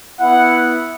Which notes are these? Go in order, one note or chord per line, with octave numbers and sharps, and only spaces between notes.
B3 E4 F#5